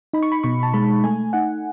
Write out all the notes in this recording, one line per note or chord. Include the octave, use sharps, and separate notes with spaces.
D#4 B5
C#6
B5
B2 C#6
A5
G#3 B5
A3 G#5
D#4 F#5